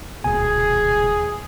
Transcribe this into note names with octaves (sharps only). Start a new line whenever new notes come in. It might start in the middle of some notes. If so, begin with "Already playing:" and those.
D#1 C#2 B2 G#4 G#5